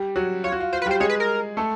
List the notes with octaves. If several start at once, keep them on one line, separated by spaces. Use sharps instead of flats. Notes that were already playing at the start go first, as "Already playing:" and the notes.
Already playing: G3 G4
F#3 F#4
F4 C#5
F#4
F4
F4 C5
B4
G3 G4 C5
G#3 G#4 C#5
B4
A#4
A3 A4